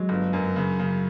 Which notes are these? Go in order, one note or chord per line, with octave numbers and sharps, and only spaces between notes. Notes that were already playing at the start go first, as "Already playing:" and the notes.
Already playing: F#3 G#3
G1
F#2
C#3
C#3